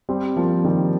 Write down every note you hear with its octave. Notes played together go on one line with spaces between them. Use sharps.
G3 C4
F3 A#3
D#3 G3